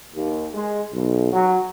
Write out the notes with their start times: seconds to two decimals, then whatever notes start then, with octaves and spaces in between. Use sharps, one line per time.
0.14 D#2
0.54 G#3
0.94 B1
1.33 F#3